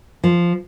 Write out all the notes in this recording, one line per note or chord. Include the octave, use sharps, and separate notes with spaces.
F3